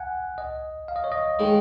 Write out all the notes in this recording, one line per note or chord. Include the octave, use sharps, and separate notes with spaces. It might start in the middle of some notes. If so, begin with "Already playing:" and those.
Already playing: F#5 G#5
D#5
F5
D#5
C#5
D#5
D#3 G#3